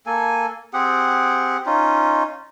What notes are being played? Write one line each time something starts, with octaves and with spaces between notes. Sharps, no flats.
A#3 A4 G#5
C4 G4 G#4 F#5
C#4 D#4 F4